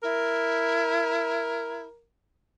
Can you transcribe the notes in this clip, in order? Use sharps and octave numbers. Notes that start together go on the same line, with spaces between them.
E4 A#4